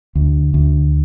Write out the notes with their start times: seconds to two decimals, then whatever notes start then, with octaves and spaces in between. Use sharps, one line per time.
0.15 D2
0.54 D2